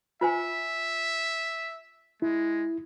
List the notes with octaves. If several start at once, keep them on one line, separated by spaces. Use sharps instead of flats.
F4 C5 E5 G#5
G#3 E4